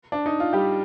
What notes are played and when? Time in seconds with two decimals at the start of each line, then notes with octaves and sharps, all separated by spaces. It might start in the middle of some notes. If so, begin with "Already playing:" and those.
0.12 D4
0.26 D#4
0.40 F4
0.53 G3 G4